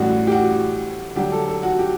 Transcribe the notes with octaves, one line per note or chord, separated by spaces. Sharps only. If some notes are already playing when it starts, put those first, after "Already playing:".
Already playing: A1 A2 E3 G3 F#4
G4
F#4
D2 D3 F#3 G4
A4
A4
F#4
G4